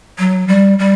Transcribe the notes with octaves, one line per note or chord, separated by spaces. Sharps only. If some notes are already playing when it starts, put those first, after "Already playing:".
F#3
G3
G3